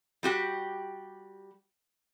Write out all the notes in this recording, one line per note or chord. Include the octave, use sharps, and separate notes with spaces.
G3 F#4 G4